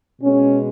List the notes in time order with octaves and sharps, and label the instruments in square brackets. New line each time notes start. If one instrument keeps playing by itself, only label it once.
[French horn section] B2 G#3 C#4